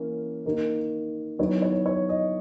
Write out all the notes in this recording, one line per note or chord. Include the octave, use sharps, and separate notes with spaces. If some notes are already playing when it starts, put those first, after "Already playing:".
Already playing: E3 A#3 C#4 E4
D#3 A#3 D#4
D#3 F#3 B3 E4 C#5
C#5
C#5
D#5